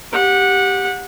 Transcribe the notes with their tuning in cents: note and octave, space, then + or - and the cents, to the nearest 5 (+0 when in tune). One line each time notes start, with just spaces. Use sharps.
G4 +0 F#5 -20